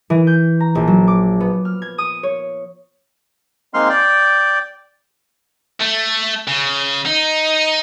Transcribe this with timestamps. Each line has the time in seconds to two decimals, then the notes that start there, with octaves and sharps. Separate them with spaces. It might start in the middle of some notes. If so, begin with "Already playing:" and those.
0.10 E3
0.27 G6
0.60 A#5
0.75 A#1
0.87 F#3
1.08 D6
1.40 B3
1.65 F6
1.82 G#6
1.98 D#6
2.23 C#5
3.74 G#3 A#3 C4 D#4 C6 F6
3.89 D5 G5
5.81 A3
6.48 C#3
7.05 D#4